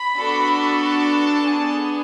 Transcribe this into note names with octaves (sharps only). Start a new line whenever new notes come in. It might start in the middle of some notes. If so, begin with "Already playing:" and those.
Already playing: B5
B3 D4 F#4 A4
A5
B3 D4 G#4